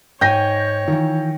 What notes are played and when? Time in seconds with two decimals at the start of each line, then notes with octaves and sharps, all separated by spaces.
0.21 G#2 D#4 C#5 G5 G#5 G6 A#6
0.88 D#3 E3 F4